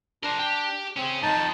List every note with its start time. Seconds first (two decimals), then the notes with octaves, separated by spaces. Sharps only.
0.23 D4 A#4 C5
0.39 G4
0.97 C4 C#4 G#4
1.22 F2 G#2 D#4 A5